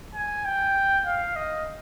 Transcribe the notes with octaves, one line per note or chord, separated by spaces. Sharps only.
G#5
G5
F5
D#5